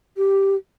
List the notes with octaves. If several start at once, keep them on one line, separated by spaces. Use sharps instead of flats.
G4